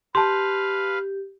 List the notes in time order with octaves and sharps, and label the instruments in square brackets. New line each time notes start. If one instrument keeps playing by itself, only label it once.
[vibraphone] G4 [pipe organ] B4 F5 [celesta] A5 C6